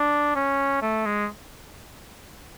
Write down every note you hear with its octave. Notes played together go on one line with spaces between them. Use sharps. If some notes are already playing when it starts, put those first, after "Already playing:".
Already playing: D4
C#4
A3
G#3